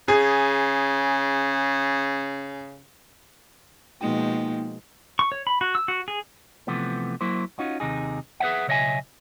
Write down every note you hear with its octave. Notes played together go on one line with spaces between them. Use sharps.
C#3 G#4
B2 F3 G#3 A#3 D#4 G5
C#6
C#5
B5
F#4
E6
F#4
G#4
C3 E3 F3 A3 B3
F#3 A#3 E4 C5
C#4 D#4 F4 F#4
D#2 C3 D#4 G#4
G#4 B4 C#5 E5 F#5
B1 C#3 C#5 D#5 E5 G#5